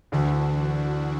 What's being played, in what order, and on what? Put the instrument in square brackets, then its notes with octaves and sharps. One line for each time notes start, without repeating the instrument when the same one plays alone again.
[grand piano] D2 D3 [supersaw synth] E3 D4 F#4